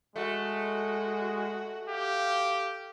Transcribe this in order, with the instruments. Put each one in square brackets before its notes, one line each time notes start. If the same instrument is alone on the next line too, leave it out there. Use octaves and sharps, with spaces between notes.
[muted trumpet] G#3 [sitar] A3 [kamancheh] F#4
[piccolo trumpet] G4 [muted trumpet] F5